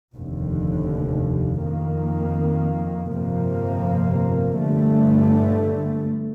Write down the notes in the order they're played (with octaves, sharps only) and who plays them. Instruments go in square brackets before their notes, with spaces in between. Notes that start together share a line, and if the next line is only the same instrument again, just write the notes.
[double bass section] F1 D#2 D3
F2 D#3 A#3
G1 F2 C3 F3 A#3
G1 G2 D3 A3